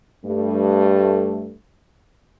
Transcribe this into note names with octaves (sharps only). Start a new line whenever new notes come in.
G2 A3